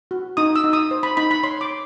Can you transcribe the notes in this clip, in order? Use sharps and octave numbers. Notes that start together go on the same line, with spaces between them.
F#4
D#4 D#6
E6
D#4
D#6
C5
B5
D#4 B5
B5
C#5 C6
D6
C#5